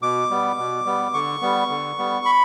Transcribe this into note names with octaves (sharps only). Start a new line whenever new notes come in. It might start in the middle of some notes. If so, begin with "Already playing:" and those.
B2 D6
G3 B3
B2
G3 B3
D3 C#6
G3 B3
D3
G3 B3
B5